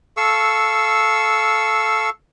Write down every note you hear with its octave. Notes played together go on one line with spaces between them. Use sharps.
A4 F5 C#6 E6